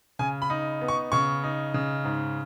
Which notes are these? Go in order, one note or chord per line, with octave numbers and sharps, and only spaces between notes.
C#3 G#5
B5
D#4
B3
C#6
C#3 C#6
D#4
C#3
G#2